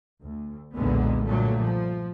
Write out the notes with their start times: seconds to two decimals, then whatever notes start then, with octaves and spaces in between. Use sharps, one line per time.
0.21 D2
0.75 B1 E2 A#2 D3 G#3 B3
1.25 G2 A#2 D3 F#3 A3
1.60 F3